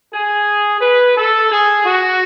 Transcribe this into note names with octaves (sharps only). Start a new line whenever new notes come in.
G#4
B4
A4
G#4
F#4